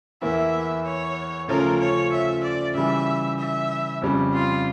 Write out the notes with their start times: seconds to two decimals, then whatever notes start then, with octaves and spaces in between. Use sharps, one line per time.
0.22 E2 E3 A#3 E4 E5
0.85 C#5
1.48 C#3 F3 A3 C#4 F4 A#4
1.80 C#5
2.12 E5
2.43 D5
2.75 C#3 E3 G3 E5
3.38 E5
4.02 F2 C#3 G3
4.33 F4